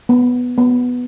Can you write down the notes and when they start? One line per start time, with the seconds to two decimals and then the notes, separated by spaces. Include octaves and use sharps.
0.09 B3
0.58 B3